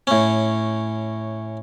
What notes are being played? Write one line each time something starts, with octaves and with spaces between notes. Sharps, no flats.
A2 C#4